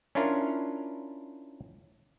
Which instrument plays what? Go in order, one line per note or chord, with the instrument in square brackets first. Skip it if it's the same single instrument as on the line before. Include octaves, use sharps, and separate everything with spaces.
[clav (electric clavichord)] C#4 D4 E4 F4 A#4